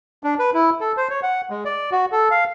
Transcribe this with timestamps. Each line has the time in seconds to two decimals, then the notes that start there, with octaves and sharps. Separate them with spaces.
0.24 D4
0.39 B4
0.54 E4
0.81 A4
0.97 C5
1.10 C#5
1.23 F#5
1.50 G#3
1.65 D5
1.92 F#4
2.12 A4
2.31 F5